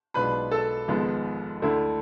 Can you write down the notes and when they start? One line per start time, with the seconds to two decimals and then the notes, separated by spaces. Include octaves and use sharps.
0.14 B1 B2 G#3 D4 F4 B4 B5
0.51 A4 A5
0.88 G#1 G#2 F3 G#3 B3
1.62 D2 D3 A3 E4